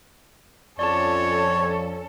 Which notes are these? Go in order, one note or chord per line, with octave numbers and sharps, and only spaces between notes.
F2 C#4 A4 C#5 D5 A5